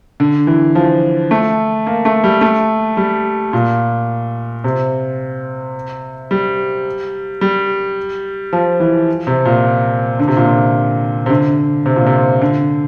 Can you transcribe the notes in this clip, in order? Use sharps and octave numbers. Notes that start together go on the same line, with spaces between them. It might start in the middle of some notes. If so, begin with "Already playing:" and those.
D3
E3
F3
A3
A#3
A3
G3
A3
G3
A#2
C3
G3
G3
F3
E3
C3
A#2
D3
C3
A#2
C3
C3
D3
C3
A#2
C3
D3